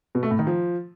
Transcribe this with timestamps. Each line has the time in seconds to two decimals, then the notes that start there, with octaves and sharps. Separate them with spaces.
0.15 B2
0.23 A3
0.31 A2
0.39 D#3
0.47 F3